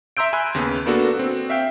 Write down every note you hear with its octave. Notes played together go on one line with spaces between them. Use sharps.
E5 A#5 C6 E6 G6 D7
G#5 B5 C6 E6 F#6
D#2 C#3 B3
A#3 B3 D4 F#4 A4
C4 F#4
E5 F5 G5